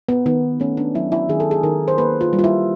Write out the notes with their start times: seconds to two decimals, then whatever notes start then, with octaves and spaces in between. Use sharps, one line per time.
0.09 B3
0.26 D#3 B3
0.60 A3 C#4
0.77 D4
0.95 F#3 E4
1.12 E4
1.29 D#3 G#4
1.40 A4
1.51 G#4
1.63 D#3 A#4
1.88 C5
1.98 A#3 B4
2.21 F4
2.33 G3
2.39 F4
2.44 E4